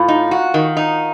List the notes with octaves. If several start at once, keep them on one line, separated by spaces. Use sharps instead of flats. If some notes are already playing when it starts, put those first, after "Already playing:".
Already playing: A2 F4
D#4
F#4
D#3
D#4